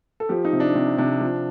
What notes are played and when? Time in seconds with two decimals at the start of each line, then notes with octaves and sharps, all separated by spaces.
0.20 A4
0.29 F3 G4
0.45 D#4
0.53 C3
0.60 D4
0.75 C3
0.98 C3 D4
1.21 F3